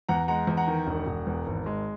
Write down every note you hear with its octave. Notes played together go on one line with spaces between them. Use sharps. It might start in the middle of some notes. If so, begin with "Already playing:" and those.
E2 F#5 A#5
G#3 F#5 A#5
E2
F#5 A#5
D#3
E1
E1
E2
G#1
G#3